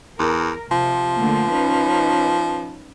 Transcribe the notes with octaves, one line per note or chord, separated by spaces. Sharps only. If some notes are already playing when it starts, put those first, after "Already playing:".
E2 A#4
C3 F3
D3 A3 A#3
C#4 D#4 B4